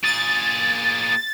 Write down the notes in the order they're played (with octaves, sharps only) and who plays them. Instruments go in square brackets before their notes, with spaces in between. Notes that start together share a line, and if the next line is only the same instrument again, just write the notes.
[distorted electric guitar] A#2 G#4 [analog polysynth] A6